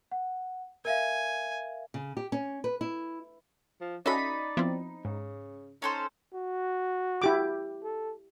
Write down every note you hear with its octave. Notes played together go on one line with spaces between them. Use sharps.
F#5
A#4 E5 F5 G#5
C#3
G4
C#4
B4
E4
F3
C#4 D#4 F#4 A4 D5 E5 B5
F3 B3 C4 E4 F4
G#2 C#3
C#4 D#4 A4 C5
F#4
E4 G4 D6
A4